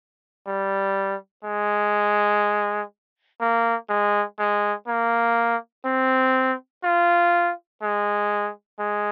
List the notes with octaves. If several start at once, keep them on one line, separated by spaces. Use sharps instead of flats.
G3
G#3
A#3
G#3
G#3
A#3
C4
F4
G#3
G#3